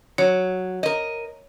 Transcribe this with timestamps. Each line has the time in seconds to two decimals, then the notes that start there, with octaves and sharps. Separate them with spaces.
0.18 F#3 C#5
0.83 A#4 D#5